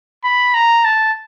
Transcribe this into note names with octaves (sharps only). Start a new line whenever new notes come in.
B5
A#5
A5